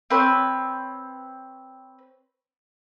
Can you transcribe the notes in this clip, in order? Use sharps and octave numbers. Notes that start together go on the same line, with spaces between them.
C4 B4 C#5